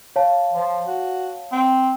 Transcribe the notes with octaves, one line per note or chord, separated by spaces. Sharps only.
C#5 F5 A5
F3
F#4
C4